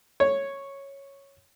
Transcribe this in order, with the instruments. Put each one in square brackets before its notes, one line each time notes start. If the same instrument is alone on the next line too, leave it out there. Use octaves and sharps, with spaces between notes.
[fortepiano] C#5